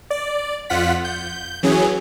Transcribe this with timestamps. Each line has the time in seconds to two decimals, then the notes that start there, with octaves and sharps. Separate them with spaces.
0.10 D5
0.70 F2 F4 F#5 B6
1.04 G6
1.63 E3 F#3 C#4 G#4